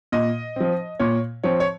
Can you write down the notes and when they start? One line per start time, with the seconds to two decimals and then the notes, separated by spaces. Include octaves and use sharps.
0.12 A#2 D#5
0.56 F3 C4
1.00 A#2 C#5
1.44 F3 C4 C#5
1.60 C#5